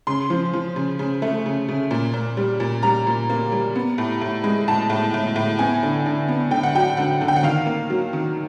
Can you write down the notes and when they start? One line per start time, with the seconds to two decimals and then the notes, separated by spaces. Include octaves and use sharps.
0.07 C#3 C6
0.30 F3
0.53 F3
0.76 C#3
0.99 C#3
1.22 A3
1.46 C#3
1.69 C#3
1.91 A#2
2.14 A#2
2.37 G3
2.60 A#2
2.83 G3 A#5
3.07 A#2
3.30 A#3
3.52 G3
3.76 B3
3.98 A2
4.21 A2
4.44 G#3
4.68 A2 A5
4.90 A2
5.14 A2
5.36 A2
5.59 B3 G#5
5.83 D3
6.06 D3
6.28 B3
6.51 D3 G5
6.63 F#5
6.75 F#3 G5
6.97 D3 F#5
7.21 D3
7.28 G5
7.36 F#5
7.43 D#3 F5
7.66 A#3
7.90 F#3
8.13 D#3